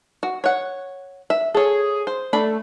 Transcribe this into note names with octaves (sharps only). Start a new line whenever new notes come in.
F#4
C#5 F#5
E5
G#4 A4 C#5
C5
A3 D4 B5